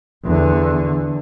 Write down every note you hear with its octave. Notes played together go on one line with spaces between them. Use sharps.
E2 D3